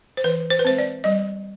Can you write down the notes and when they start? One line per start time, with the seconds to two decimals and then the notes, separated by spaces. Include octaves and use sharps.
0.17 C5
0.24 E3 B4
0.50 C5
0.59 B4
0.65 G#3 C4 C5
0.78 D5
1.04 G3 D#5